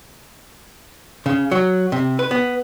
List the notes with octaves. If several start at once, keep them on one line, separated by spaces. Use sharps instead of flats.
C#3
F#3
C3
B4
B3